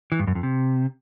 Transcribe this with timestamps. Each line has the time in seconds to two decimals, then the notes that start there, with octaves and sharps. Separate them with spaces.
0.12 E3
0.20 G2
0.27 F#2
0.35 F2
0.43 C3